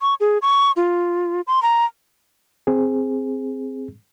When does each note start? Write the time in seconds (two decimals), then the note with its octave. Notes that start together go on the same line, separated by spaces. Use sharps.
0.02 C#6
0.20 G#4
0.42 C#6
0.77 F4
1.47 C6
1.62 A#5
2.67 C4 G#4